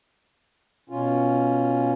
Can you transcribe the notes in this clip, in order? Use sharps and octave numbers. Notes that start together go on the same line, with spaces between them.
B2 C#4 F4